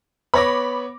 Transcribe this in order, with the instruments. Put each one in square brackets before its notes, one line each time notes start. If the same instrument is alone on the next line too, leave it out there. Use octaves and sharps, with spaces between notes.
[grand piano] B3 C#5 A#6 [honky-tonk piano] B5 D6